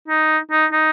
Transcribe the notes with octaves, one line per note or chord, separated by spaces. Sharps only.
D#4
D#4
D#4